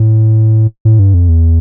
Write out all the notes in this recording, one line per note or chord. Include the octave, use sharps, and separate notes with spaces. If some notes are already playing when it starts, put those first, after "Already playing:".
Already playing: A2
A2
G2
F2
E2